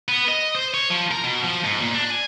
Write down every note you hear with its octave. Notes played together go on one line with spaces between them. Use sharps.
B3
D#5
C5
C#5
F3
A#4
B2
F3
G#2
A#2
D4
G#5